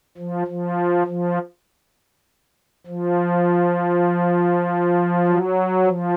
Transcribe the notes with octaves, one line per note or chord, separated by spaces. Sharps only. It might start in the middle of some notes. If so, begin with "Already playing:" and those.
F3
F3
F3
F3
F#3
F3